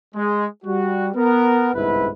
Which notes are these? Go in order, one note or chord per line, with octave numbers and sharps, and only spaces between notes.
G#3
G3 F#4
B3 A#4
G1 C2 G#2 E4 B4